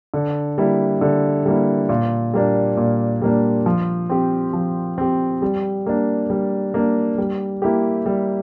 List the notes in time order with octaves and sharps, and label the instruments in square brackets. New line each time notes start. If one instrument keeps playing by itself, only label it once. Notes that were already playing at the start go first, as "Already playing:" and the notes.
[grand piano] D3
G3 A#3 E4
D3
G3 A#3 E4
A#2
G3 A#3 D4
A#2
G3 A#3 D4
F3
C4 G4
F3
C4 G4
G3
A#3 D4
G3
A#3 D4
G3
A#3 E4 G4
G3